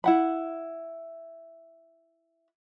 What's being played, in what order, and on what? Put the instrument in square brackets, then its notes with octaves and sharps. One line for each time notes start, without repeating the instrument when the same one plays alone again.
[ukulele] E4 F#5 B5